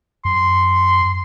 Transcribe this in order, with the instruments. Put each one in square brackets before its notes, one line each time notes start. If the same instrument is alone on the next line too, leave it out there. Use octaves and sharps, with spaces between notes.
[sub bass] F#2 [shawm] C6